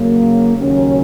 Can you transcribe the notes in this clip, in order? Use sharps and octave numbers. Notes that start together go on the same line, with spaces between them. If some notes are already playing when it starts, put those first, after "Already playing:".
Already playing: C#3 F#3 A#3
D#2 C#3 F#3 C#4